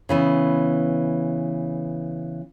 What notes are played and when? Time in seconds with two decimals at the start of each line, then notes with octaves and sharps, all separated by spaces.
0.09 C#3 E3 B3